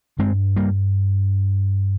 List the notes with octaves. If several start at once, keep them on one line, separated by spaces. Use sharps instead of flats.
G2 G#3 C4
G3 A#3